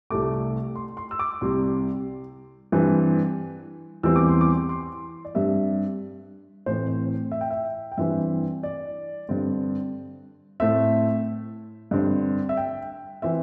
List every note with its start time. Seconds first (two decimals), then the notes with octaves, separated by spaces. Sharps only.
0.10 C2 C3 A3 D6
0.75 C6
0.97 C6
1.11 E6
1.19 D6
1.41 C2 C3 G3 C6
2.72 G2 E3 G3 C4
4.03 E2 E3 G3 C4 E6
4.16 D6
4.29 C6
4.41 D6
4.69 C6
5.25 D5
5.34 G2 G3 C4 E5
6.66 A2 E3 C4 C5
7.32 E5
7.41 G5
7.50 E5
7.92 G5
7.98 G2 E3 C4 E5
8.63 D5
9.29 G2 D3 C4
10.60 A2 A3 C4 E5
11.91 G2 D3 C4
12.49 E5
12.57 G5
13.22 E3 C4 E5